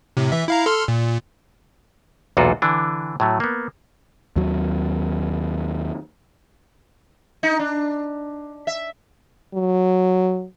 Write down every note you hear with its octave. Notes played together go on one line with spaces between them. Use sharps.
A2 C3
E3 E5
E4 F5 A#5
A4 C6 F6
A#2
B1 E2 A#2 F4 F#4 A4
D3 E3 D4
A2 F#3 A3
A#3 B3
D#2 F#3
D#4
D4
E5
F#3